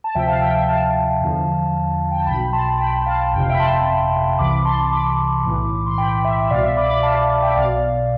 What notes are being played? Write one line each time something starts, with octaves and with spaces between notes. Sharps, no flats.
A5
D2 C3 F3 E5 G5
F5 A5
E5 G5
E5 G5
F5 A5
E2 D3 F3
G5
A5
B1 B2 G5 B5
A5 C6
G5 B5
F5 A5
G1 F2 C3 G5
F5
E5 G5
B5
A5 C6
C2 C3 E3 B5 D6
A5 C6
B5 D6
B1 A2 E3
C6
G5 B5
E5
E5
C2 B2 D5 F5
E5
B5 D6
B5 D6
F5 A5
E5 G5
B1 B2 D5 F5